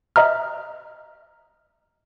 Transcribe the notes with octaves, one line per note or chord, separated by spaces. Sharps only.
D#5 E5 A#5 F6